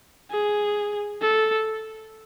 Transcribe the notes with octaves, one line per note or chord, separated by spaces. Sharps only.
G#4
A4